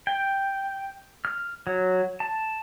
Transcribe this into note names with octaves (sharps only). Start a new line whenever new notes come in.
G5
F6
F#3
A5